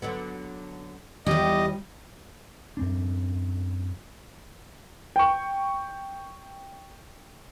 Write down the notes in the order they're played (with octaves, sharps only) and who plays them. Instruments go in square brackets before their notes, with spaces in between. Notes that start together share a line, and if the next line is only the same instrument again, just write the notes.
[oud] D3 F#3 B3
[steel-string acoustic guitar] E2 G4 [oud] F3 G3 [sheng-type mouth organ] D#5
[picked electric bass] F#2 C4 D4
[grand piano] G5 C#6